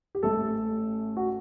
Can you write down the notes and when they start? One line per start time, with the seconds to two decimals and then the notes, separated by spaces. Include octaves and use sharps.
0.15 G4
0.23 A1 A2 A3 A4
1.17 F#4